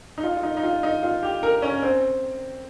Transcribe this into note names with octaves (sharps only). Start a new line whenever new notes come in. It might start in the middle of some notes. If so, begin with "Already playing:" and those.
D#4
F4
F4
D#4
D#4
F4
D#4
F4
G4
A#4
C#4
C4